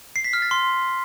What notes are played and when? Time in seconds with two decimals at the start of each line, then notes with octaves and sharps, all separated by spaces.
0.16 C7
0.24 B6
0.33 F6
0.42 A6
0.51 C6